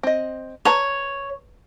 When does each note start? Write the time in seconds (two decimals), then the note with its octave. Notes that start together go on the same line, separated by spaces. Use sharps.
0.03 C4 D#5
0.65 B4 C#5 A5 A#5